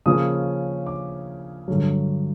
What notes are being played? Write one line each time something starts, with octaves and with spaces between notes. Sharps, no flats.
C#3 F3 A#3 C#4 D#6
D6
G2 D3 F#3